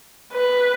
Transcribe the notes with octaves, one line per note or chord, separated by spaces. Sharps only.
B4